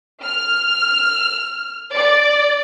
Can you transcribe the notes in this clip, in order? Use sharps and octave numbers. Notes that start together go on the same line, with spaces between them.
F6
D5